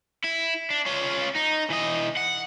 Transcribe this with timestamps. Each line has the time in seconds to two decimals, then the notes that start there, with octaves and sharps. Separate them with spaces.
0.24 E4
0.70 D4
0.86 C#4 F4
1.36 D#4
1.70 E3 D#5
2.17 F#5